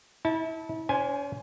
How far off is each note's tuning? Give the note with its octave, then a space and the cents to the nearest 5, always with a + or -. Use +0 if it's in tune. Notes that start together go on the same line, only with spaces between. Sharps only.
E4 -35 A5 +0
C#4 +40 C5 +0 G#5 +0